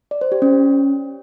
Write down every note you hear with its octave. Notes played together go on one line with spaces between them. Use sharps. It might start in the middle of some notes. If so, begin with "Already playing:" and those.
D5
C5
G4
C#4